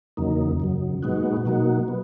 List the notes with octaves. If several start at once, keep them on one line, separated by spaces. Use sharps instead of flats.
E2 C#3 F#3 A#3 D#4
F#2 C#3 F#3
A#2 G#3 B3 D#4 F#4
B2 F#3 A#3 D#4 F#4
B3